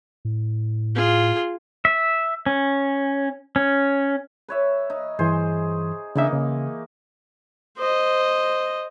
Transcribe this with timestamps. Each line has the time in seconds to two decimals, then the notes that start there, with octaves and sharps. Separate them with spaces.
0.25 A2
0.95 F4 G#4
1.85 E5
2.46 C#4
3.56 C#4
4.48 B4 C#5 E5
4.90 D#4
5.19 G2 E3 G#4 C5
6.16 C#3 E3 A#3 D4 D#4 E5
6.33 C#3
7.78 C5 D#5